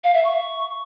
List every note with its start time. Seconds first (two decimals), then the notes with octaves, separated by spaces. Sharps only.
0.04 F5
0.14 E5
0.25 C#6